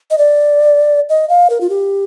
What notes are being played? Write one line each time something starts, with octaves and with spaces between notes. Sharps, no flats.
D#5
D5
D#5
F5
A#4
F4
G4